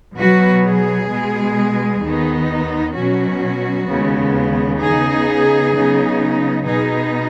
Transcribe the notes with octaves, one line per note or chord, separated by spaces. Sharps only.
B2 F#3 B3 F#4 B4
G#4
B2 G#3 B3
D#2 D#3 B3 D#4
B2 F#3 C#4 F#4
D#2 C#3 G#3 B3
C#3 B3 D#4 G#4
C#3 F#3 B3 D#4
B2 B3 D#4 G#4